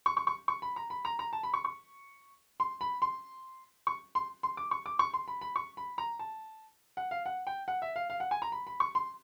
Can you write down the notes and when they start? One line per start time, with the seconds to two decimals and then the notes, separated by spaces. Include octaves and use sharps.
0.06 C#6
0.17 C#6
0.27 C#6
0.48 C#6
0.62 B5
0.76 A#5
0.90 B5
1.05 A#5
1.19 A#5
1.33 A5
1.43 B5
1.54 C#6
1.65 C#6
2.60 C6
2.81 B5
3.02 C6
3.87 C#6
4.15 C6
4.43 C6
4.57 D6
4.71 C#6
4.86 D6
4.99 C#6
5.14 C6
5.28 B5
5.41 B5
5.56 C#6
5.77 B5
5.98 A#5
6.19 A5
6.97 F#5
7.11 F5
7.26 F#5
7.47 G5
7.68 F#5
7.82 E5
7.96 F5
8.10 F5
8.20 F#5
8.31 G#5
8.42 A#5
8.52 B5
8.67 B5
8.80 C#6
8.95 C6